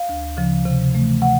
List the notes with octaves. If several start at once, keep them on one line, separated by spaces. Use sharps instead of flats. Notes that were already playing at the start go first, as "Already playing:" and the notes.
Already playing: F5
D2
C#3 F3
C3
E3 A3
C3 F#5